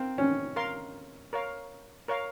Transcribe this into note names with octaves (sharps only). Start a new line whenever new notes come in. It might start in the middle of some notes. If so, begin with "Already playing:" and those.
Already playing: C4 A#4 F5
C#4
A#4 F5 C6
A#4 C#5 F5
A#4 C#5 F5